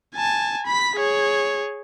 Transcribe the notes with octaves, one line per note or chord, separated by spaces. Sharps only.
G#5 A5
B5 B6
G#4 C#5